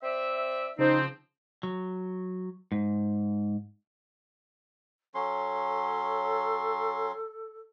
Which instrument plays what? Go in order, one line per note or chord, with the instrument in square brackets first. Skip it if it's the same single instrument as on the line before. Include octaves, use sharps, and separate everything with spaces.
[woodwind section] C4 D5 E5
[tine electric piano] C#3 C5 C6 [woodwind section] F3 C4 [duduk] D#4
[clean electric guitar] F#3
G#2
[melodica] F#3 C#4 C6 [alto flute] A4